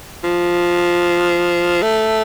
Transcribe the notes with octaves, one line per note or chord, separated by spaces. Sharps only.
F3
A3